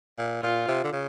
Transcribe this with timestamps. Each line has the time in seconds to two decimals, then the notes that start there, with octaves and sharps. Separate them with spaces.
0.18 A#2
0.43 A#2 F4
0.68 C3
0.84 D3
0.93 C#3